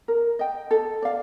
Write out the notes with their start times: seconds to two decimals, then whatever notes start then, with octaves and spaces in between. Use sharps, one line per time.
0.08 A#4
0.39 D#5 G5
0.71 A4
1.02 D5 F5